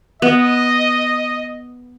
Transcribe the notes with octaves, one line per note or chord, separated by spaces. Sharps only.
B3 D#5